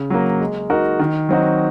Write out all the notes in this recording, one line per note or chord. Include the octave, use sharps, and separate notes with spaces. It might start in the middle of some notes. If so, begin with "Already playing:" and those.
Already playing: C#3
F#3 A#3
G#3
D#4 F#4 A#4
D#3
F#3 C4 D#4 F#4